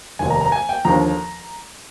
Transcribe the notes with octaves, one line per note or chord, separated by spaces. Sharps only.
F1 D#2 D#3 G#5
A#5
A#5
G#5
G5
D#2 D3 F3 A#5